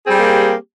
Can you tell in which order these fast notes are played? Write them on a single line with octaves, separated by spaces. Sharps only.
G#4 C4 G3 G4 A#3